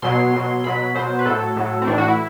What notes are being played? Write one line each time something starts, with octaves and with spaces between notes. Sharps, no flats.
B2 F#3 C6
B2 F#3
B2 F#3 B5
B2 F#3 C5
B4
A2 F#3 A4
A2 F#3
C4
A2 E3 D4
F#4
E4